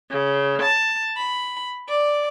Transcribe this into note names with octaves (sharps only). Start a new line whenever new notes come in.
C#3
A5
B5
D5